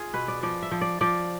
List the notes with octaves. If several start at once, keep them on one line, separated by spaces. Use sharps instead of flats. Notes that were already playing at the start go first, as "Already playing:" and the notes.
Already playing: F4 G#4
B2 B4
D5
F3 D5
E5
F3
D5
F3 D5